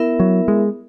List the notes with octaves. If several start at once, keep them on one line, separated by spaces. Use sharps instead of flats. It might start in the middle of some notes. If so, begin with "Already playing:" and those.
Already playing: B3 E4 A#4 E5
F#3
G#3